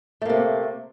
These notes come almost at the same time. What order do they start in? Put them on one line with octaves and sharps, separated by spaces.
A3 A#3 C3